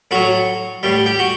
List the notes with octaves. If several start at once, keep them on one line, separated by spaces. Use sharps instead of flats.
A2 F#3 F#4
A2 G3
G4
F#4